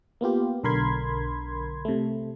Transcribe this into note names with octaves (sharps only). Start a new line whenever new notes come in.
A#3 B3 F4 G4
B1 D3 A#4 B5 C6 G#6
C3 A3